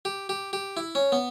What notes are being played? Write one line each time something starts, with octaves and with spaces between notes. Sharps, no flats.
G4
G4
G4
E4
C#4
B3